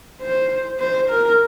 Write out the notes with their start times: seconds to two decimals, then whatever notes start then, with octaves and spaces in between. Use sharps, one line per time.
0.21 C5
0.79 C5
1.09 A#4